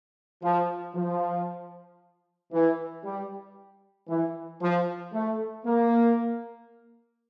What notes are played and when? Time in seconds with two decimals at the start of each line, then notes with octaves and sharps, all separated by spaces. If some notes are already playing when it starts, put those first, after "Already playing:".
0.43 F3
0.95 F3
2.53 E3
3.04 G3
4.08 E3
4.61 F3
5.14 A3
5.66 A#3